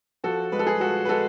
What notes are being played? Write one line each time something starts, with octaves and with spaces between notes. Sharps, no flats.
F3 F#4 A4
G#3 B4
A4
G#4 B4
F3 F#4 A4
B4
G#3 F#4 A4